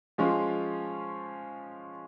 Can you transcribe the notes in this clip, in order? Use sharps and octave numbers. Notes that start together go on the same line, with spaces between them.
F3 G#3 C#4 F4